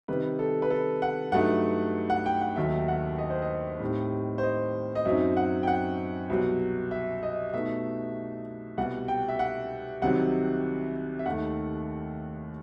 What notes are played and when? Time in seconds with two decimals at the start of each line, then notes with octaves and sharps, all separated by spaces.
0.08 C3 D#3 G3 B4
0.39 A4
0.62 B4
0.70 A4
1.02 F#5
1.32 G2 F#3 A3 D#4 F#5
2.10 F#5
2.26 G5
2.41 F#5
2.56 D#2 D#3 F#3 A3 E5
2.88 F#5
3.18 D#5
3.30 C5
3.42 D#5
3.80 A2 G3 C4 D#4
4.38 C5
4.43 D#5
4.95 D#5
5.05 F#2 F#3 C4 D#4 E5
5.37 F#5
5.63 G5
5.67 F#5
6.30 C2 B2 F#3
6.91 E5
7.23 D#5
7.53 B2 A3 D#4 E5
8.77 C2 B2 G3 F#5
9.08 G5
9.29 E5
9.39 F#5
10.02 C2 C3 D#3 F#3 F#5
11.19 E5
11.26 D#2 D#3 A3 F#5